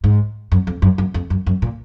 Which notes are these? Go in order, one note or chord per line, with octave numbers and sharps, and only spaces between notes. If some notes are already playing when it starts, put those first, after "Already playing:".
G#2
F#2
F2
F#2
F#2
F2
F#2
F#2
A#2